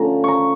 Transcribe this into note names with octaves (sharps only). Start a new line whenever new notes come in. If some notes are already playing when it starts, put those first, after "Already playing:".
Already playing: D3 F3 A3 C#4 A#5
A#5 C#6